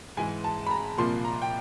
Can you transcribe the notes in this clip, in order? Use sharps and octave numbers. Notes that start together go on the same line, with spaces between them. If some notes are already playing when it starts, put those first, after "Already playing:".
G#2 E3 G#3 G#5
A5
B5
A#5
C2 A#2 F3 A#3 C6
A#5
G5